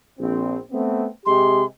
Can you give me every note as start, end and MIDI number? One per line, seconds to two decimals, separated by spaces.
0.19 0.57 34
0.19 0.57 60
0.72 1.07 57
0.72 1.07 59
0.72 1.07 60
1.26 1.63 48
1.26 1.63 56
1.26 1.63 67
1.26 1.65 84